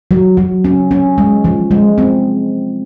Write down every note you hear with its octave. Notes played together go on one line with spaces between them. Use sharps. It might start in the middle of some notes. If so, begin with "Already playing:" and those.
F#3
F#3
C#4
C#4
G#3
F3
G#3
C4